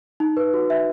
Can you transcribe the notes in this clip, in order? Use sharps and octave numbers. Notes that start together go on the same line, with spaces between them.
D#4
B4
F#4
E5